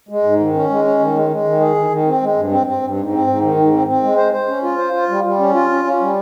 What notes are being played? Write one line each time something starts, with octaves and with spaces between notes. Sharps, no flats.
G#3
G#2
D#3
C#4
G#3
C#4
D#3
G#3
G#3
D#3
G#4
D#3
D#3
C4
G#3
G2
C4
C4
G2
G#2
C4
G#2
D#3
G#2
C4
C4
G#3
C5
C5
C#4
F4
C5
F4
G3
G3
C#4
F4
C#4
C#4
G3